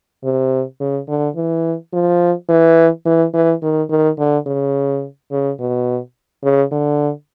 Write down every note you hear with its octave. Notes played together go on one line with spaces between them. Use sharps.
C3
C#3
D3
E3
F3
E3
E3
E3
D#3
D#3
D3
C#3
C#3
B2
C#3
D3